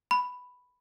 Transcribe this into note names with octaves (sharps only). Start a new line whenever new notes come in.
B5